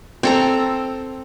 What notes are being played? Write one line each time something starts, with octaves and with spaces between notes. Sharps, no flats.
C4 A4 A#5